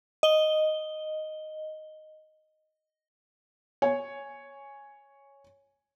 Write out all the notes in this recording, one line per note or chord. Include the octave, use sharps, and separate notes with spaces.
D#5 G7
C#5 G#5